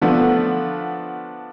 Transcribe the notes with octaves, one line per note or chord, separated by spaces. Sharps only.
D3 F3 A3 B3 D4